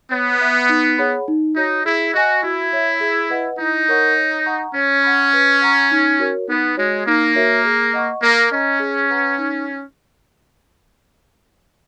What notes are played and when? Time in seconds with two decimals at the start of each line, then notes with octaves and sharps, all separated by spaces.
0.11 B3 C#5
0.41 E5 B5
0.69 D#4
0.98 G#4 C#5 F#5 B5
1.28 D#4
1.56 D#4 F#4 C#5
1.85 E4 G#4
2.14 F#4 D#5 G#5
2.43 E4 F#4
2.73 C#5 E5
3.01 G#4
3.30 B4 D#5 F#5
3.58 D#4 E4
3.89 A#4 C#5 F#5 C#6
4.16 C#5
4.46 F#5 A#5 C#6
4.74 C#4 C#5
5.03 F#5 B5
5.33 B4
5.61 F#5 A#5 C#6
5.91 D#4
6.19 F#4 A#4 C#5
6.48 B3 D#4
6.77 G#3 F#4 C#5
7.07 A#3 D#4
7.36 F#4 A#4 C#5 E5
7.65 G#4
7.93 D#5 F#5 C#6
8.22 A#3 A#4
8.52 C#4 D#5 A#5 C#6
8.80 G#4
9.09 B4 F#5 A#5
9.38 D#4